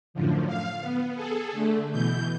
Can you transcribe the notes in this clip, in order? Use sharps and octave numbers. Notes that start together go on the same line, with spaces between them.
F#2 A2 D3 F3
F5
B3
G#4 A4
D3 A3
B2 E3 G6